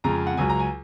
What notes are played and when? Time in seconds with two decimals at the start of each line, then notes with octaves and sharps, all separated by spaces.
0.04 F2 C#3 G#3 A#5
0.27 F#5
0.37 C#2 C#3 F#3 G#5
0.49 A#5
0.59 G#5